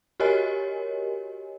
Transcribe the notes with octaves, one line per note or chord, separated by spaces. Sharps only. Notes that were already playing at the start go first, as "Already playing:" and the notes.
F#4 G4 A#4 C#5 D#5 G#5